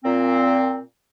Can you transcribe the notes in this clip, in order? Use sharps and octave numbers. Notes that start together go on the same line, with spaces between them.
A#2 C4